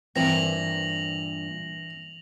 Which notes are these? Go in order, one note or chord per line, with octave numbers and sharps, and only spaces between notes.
G2 A#2 E3 C4 A#5 A#6 F7 F#7